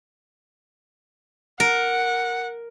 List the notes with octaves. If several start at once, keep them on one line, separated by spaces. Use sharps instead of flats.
A#4 F#5